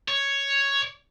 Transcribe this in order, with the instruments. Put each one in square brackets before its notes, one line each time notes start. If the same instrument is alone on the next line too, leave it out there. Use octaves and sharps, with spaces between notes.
[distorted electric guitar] C#5